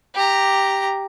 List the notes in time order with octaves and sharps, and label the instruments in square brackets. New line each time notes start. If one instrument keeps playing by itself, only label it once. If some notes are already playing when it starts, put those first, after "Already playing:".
[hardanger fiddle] G4 A#5